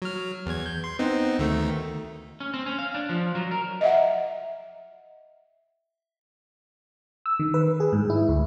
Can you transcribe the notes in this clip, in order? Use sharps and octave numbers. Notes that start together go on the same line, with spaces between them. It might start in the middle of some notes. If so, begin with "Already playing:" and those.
F#3 F6
E2 G#6
G6
C6
B3 C4 D#4
D2 D#3 A3
C#4
C4
C#4
F5
D4
F3
F#3
A#4
D#5 E5 F#5
E6
D#3
B4
G#4
G#2
E4
D2